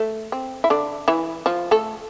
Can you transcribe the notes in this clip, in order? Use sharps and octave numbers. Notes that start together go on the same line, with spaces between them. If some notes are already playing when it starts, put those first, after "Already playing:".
Already playing: A3
C4
E4
D3 D4
E3 E4
F3 F4
A3 A4